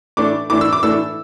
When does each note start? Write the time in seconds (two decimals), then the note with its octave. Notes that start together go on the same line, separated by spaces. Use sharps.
0.17 A2 E3 A3 D4 D6
0.50 A2 E3 A3 D4 D6
0.61 E6
0.73 D6
0.83 A2 E3 A3 D4 E6